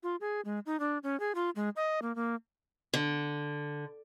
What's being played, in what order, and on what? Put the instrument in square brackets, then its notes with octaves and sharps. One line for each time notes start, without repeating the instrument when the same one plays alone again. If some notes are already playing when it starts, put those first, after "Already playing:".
[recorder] F4
G#4
G#3
D#4
D4
C#4
G#4
F4
G#3
D#5
A#3
A#3
[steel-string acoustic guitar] D3